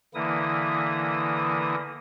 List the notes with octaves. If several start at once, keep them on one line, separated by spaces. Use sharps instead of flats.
D3 E3 A#3 E4 D#6